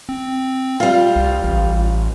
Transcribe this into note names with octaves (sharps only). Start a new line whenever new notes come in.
C4
G3 F4
C2
A1